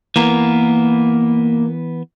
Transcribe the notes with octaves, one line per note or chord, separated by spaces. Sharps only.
E3 A#3 B3 A#4